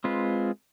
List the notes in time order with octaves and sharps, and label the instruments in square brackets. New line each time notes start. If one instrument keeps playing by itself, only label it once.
[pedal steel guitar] G#3 C4 F4 B4